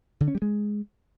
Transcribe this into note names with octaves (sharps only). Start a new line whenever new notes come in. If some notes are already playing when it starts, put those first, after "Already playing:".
D3
C#4
G3
G#3